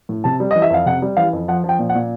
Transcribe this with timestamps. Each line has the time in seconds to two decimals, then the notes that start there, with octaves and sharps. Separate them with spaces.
0.09 A2
0.24 C3 A5
0.40 G3
0.51 E3 D#5
0.62 E5
0.70 F2 F5
0.86 C3 F#5
1.02 G3
1.17 E3 F5
1.33 F2
1.48 F3 F#5
1.64 F3
1.69 G5
1.79 A#2
1.89 F#5
1.95 A#2